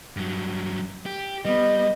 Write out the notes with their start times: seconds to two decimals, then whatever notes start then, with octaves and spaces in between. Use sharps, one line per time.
0.16 G2 F#3
1.06 G4
1.45 G3 B3 D#5